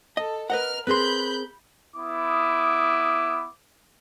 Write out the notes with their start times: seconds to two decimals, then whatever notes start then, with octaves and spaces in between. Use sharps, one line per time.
0.17 A4 D#5
0.50 A#4 B4 D#5 F#5 F6
0.87 C4 G#4 A#4 B4 B5 C6 F#6 G6
1.96 B3 E4 D6 D#6